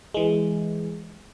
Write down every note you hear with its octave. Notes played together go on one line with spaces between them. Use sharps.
E3 G#3